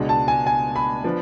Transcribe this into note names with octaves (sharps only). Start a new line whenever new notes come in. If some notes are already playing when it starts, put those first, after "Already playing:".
Already playing: C#2 B2 G#3 D4
A5
G#5
G#5
B5
F3 B3 D4